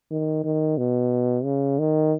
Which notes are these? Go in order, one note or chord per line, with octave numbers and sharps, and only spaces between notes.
D#3
D#3
B2
C#3
D#3